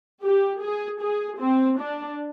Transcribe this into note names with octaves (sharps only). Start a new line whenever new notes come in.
G4
G#4
G#4
C4
D4